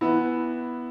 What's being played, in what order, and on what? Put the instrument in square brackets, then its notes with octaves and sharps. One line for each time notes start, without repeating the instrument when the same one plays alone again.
[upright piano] E3 B3 E4